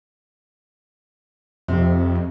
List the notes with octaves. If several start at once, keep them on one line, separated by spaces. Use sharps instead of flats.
F2 C3